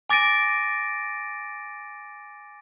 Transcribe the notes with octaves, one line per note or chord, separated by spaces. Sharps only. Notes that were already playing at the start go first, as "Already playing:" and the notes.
G#5 D6 A6 A#6 D7 D#7